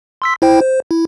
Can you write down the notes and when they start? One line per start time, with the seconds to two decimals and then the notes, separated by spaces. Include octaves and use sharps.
0.22 C6 E6 B6
0.42 E4 C5 G5
0.62 C5
0.91 E4